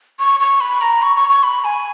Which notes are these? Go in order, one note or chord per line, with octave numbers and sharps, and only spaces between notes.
C#6
C#6
B5
A#5
C#6
C#6
C#6
B5
G#5